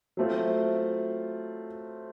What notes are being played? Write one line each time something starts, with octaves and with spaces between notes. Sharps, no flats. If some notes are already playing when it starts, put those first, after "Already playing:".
F#3 A3 C4 F4